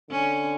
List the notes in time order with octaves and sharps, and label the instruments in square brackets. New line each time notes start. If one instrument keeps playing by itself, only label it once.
[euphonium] D3 [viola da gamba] C#4